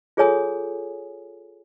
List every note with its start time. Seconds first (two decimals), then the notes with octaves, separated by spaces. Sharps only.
0.17 F4 G#4 A4 C#5 G#5 D#6